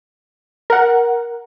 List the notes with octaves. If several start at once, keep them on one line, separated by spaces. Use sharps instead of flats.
A#4 F#5